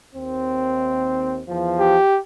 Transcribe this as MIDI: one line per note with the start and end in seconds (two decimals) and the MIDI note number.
0.15 1.42 39
0.15 1.42 60
1.47 1.96 40
1.47 1.96 53
1.80 2.19 67